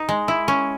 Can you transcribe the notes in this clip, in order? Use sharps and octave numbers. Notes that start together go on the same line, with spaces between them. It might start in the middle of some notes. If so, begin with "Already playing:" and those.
Already playing: D#4
G#3
E4
C#4